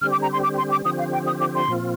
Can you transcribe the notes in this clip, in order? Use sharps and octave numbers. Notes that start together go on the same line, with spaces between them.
D3 G3 C4 G4 F6
D6
A#5
C6
D6
C6
D6
D3 F3 C4 G4 D#6
F5
G5
D#6
D6
C6
A#2 F3 C4 F4